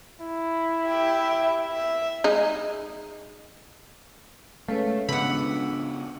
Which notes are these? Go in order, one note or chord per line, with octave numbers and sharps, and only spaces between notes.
E4
G4 E5
E5
G#3 D#4
G#3 A3 C#4 A4 B4 C#5 F5
C#3 B3 D4 F#5 B5 E6